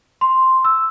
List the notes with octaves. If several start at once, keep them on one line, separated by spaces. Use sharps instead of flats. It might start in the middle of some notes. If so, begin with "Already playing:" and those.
C6
E6